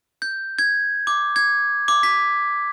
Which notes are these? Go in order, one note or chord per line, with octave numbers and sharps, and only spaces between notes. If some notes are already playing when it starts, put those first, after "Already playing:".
G6
G#6
D6
G#6
D6
B6